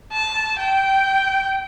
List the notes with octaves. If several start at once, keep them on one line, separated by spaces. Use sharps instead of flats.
A5
G5